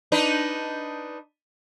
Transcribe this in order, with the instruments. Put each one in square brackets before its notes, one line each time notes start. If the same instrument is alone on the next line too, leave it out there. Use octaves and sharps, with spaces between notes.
[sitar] D4 D#4 B4